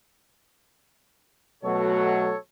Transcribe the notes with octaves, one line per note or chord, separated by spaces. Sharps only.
B2 F#3 A3 A4 C#5